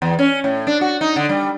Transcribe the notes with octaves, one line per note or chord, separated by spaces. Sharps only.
E2
C#4
A2
D4
F#4
D#4
D3
G3